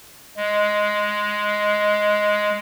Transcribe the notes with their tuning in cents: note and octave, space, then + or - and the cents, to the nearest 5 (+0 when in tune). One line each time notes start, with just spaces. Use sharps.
G#3 +5